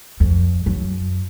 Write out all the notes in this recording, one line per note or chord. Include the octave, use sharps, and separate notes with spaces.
F2
F#2